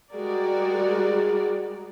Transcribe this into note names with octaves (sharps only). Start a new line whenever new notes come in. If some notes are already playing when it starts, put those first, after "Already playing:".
G3 G#3 F#4 G#4 A#4 D5